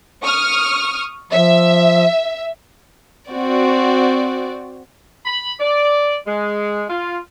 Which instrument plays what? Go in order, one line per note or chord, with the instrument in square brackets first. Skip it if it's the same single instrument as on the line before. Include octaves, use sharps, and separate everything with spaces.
[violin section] C#6 D#6 F6
[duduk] F3 [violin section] E5
[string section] C4 F#4 D5
[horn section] B5
D5
G#3
F4